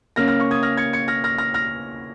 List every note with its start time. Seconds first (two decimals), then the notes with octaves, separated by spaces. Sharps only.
0.16 C#3 A#3 C#4 F6 A#6
0.28 F6 A#6
0.40 C#6 F6
0.51 D#6 G#6
0.63 F6 A#6
0.77 G#6 C#7
0.93 G#6 C#7
1.08 F6 A#6
1.24 F6 A#6
1.38 F6 A#6
1.54 F6 A#6